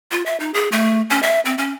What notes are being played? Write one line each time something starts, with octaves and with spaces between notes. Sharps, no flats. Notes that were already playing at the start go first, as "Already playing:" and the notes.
F4
E5
D#4
G#4
A3
C#4
E5
C4
C#4